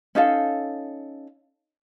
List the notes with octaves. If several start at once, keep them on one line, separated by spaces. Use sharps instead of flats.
C#4 D#4 A4 F5